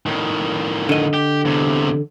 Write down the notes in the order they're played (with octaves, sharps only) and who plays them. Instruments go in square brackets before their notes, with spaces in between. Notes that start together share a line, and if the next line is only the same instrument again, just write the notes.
[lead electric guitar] A2 D#3
[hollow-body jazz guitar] D3 D#5
[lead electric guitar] G4
E2 C3